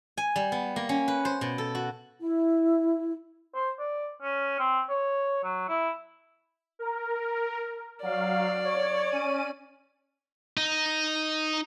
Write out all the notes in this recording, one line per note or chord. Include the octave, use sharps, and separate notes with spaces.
G#5
G3
B3
A#3
C#4
B4
C5
B2
A4
F#4
E4
C5
D5
C#4
C4
C#5
F#3
E4
A#4
F#3 D5 F5
C#5
C#4 D#7
D#4